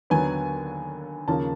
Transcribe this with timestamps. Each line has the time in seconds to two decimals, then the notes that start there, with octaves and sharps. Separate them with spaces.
0.10 D#2 D3 F#3 B3 G#5
1.28 D#2 C#3 F3 A#3 A5